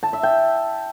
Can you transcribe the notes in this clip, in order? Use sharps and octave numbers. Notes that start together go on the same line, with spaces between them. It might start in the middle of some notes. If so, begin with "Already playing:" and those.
A5
E5
G5